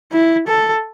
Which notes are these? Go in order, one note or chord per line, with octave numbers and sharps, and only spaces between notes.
E4
A4